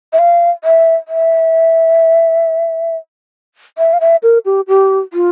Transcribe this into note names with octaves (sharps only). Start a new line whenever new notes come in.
E5
F5
E5
E5
E5
F5
E5
A#4
G4
G4
F4